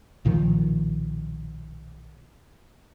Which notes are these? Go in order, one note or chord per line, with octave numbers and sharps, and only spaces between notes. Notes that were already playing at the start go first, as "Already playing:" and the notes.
B1 A#2 D#3 F3